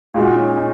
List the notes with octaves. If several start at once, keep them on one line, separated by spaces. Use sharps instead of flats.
A#2 G#3 D#4 F#4
C#4
D#4